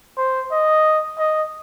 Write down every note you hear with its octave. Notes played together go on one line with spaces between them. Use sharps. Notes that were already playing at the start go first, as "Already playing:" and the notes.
C5
D#5
D#5